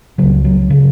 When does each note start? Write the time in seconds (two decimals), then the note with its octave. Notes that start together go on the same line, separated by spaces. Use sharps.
0.18 C#2 C#3 F#3
0.44 F#3
0.70 C#3